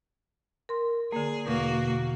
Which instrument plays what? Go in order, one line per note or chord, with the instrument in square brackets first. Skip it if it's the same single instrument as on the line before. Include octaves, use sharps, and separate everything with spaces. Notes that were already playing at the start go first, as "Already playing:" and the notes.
[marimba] A#4 C6
[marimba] D3 A#3 [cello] G#4
[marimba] E2 B2 [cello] A#3 F#4